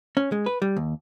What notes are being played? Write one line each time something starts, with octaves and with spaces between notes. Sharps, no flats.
C#4
G#3
B4
G3
D#2